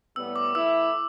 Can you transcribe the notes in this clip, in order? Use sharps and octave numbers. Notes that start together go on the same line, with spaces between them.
A2 G3 B3 E6
D6
E3 A3 E4 E6